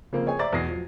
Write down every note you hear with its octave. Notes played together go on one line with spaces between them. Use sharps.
C#3 F3 A#3 C4
G#4 C#5 G5 G#5
C5 D5 E5 A#5 D6 A6
E2 B2 G#6 A#6 C7
F3 F#3